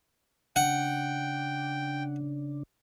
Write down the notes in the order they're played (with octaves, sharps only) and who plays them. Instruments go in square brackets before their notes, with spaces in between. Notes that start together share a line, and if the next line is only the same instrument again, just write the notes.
[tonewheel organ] C#3 D4 [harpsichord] F#5 [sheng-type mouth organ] G5